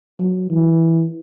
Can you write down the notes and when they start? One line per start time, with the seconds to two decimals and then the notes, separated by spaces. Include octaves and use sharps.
0.19 F#3
0.50 E3